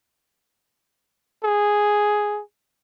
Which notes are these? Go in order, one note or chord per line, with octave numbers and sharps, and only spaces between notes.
G#4